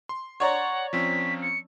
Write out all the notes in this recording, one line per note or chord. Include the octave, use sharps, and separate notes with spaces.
C6
C#5 D5 F#5 A#5
F3 C4 C#4 B6
C#7